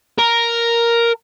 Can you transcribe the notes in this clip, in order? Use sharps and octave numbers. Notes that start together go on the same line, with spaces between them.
A#4